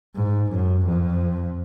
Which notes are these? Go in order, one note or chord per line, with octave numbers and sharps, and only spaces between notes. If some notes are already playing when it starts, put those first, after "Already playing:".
G#2
F#2
F2